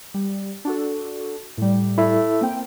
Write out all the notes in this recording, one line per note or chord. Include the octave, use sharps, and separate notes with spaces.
G3
D4 F#4 A4
A2 G3
E4 A4 E5
A#3 C4 G5